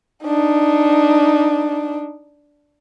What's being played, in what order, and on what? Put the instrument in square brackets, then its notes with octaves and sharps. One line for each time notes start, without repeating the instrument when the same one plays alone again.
[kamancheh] D4 D#4